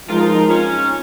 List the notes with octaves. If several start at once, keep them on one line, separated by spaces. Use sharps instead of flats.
F3 G#3 D#4 F4 A#4
C#4